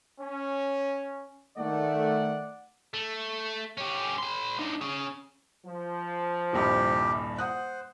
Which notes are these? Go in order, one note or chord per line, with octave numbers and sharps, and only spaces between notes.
C#4
D#3 A3 D5 F#5
A3
C#4 G4
B4 C6
D4 D#4
C#4 G#4
F3
D#1 C2 G2 C3 G4
C5 F#5 D#6 F#6